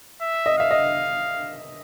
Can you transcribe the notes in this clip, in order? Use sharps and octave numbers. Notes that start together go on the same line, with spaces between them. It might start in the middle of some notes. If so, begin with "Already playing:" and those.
E5
D#5
E5 F5
D#5